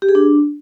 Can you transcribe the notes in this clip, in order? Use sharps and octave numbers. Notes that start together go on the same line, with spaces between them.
G4
G#4
D4